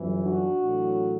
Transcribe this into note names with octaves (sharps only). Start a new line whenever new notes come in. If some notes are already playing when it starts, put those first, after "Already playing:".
Already playing: G1 F#2 E3
D4 F#4
A1 A2 F#3